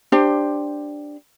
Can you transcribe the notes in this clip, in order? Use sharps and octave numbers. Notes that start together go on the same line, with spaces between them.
D4 G4 C5